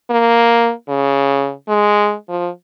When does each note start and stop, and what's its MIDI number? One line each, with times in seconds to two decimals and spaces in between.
0.10 0.72 58
0.89 1.52 49
1.68 2.15 56
2.29 2.49 53